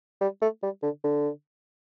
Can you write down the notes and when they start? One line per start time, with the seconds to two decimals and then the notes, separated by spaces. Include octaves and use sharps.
0.21 G3
0.42 A3
0.63 G3
0.83 D3
1.04 D3